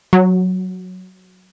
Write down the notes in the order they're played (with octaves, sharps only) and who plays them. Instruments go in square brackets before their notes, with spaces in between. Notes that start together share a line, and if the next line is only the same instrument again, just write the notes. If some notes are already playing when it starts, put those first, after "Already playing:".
[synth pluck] F#3